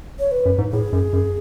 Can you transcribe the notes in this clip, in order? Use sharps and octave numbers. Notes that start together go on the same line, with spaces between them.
C#5
B4
F#2
G#2
A2 G#4
F#2
F#2